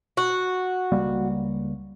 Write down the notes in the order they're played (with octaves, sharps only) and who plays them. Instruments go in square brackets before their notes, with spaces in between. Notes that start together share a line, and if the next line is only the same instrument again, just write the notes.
[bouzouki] F#4
[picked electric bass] C#2 G3 A#3